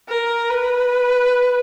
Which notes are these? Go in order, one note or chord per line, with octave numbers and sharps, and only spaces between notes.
A#4
B4